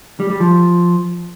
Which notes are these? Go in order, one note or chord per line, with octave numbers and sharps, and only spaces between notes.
G3
G3
F3